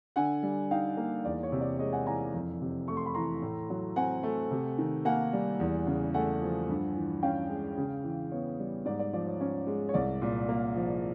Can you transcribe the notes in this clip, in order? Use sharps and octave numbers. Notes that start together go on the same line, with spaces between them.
D3 F#5 G#5
G3
D#4 F5 G5
A#3
E2 D5
C#5
C3
D5
G#3 C#5 D#5
F#5 G#5
E3 G#5 A#5
F2
C3
A3 C#6
C6
B5
E3 A#5 C6
A2
F#3
C4 F#5 G#5
A3
C3
D#3
A#3 F#5 G#5
G3
E2
C#3
A3 F#5 G#5
F3
G2
E3
C#4 F5 G5
G#3
C#3
E3
B3 C#5
G3
G#2 D5
D5
F3 D5
C#5
C#4 C#5
G#3
C#5
C2 D5
A#2
A#3
F3